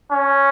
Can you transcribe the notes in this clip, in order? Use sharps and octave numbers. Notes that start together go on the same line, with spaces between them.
C#4